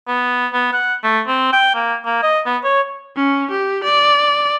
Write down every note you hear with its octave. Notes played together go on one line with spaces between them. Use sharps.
B3
B3
F#5
A3
C4
G5
A#3
A#3
D#5
B3
C#5
C#4
G4
D5